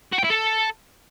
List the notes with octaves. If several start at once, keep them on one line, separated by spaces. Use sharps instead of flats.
F#4
G5
E4
A4